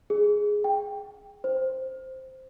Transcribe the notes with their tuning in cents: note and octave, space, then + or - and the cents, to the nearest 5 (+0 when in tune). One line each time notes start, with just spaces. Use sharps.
G#4 +5
G5 +10
C5 +0